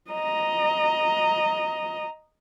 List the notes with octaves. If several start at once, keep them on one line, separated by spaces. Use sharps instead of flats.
D#5 A#5